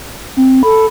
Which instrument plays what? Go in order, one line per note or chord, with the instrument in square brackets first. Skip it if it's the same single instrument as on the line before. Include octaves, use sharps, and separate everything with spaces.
[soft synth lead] C4
[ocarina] A4 [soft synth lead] B5